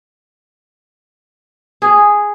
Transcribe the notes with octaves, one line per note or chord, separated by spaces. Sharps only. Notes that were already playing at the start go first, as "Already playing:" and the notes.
G#4